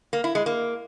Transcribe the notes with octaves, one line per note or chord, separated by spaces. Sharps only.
A#3
E4
G#3
A#3